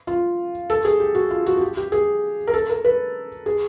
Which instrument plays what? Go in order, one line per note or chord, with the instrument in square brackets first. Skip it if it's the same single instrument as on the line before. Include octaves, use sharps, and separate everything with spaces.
[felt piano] F4
A4
G#4
G4
F#4
F4
F#4
F#4
G4
G4
G#4
A#4
A4
A#4
B4
G#4